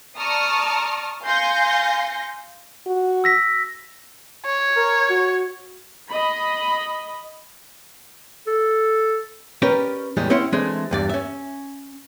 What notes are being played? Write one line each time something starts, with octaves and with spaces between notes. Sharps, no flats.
D5 A5 A#5 C#6 D#6 F6
F5 G#5 C6 G6 A#6 C#7
F#4
E6 A#6 B6
C#5
A#4
F#4
D#5 B5
A4
C#4 G4 A#4 B4 D5
E2 A2 G3 G#3
C4 C#4 E4 F#5 C6
E3 G#3 A3 C4 D4
E2 G2 D5
C#4 E5